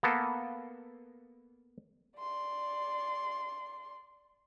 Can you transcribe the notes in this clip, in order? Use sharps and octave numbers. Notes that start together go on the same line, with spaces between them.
A#3 B3 A4
D5 C6